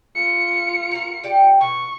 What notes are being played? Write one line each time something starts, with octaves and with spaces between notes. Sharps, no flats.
F4 C#7
F#4 A#4
G4 D5 G5
B2 C#6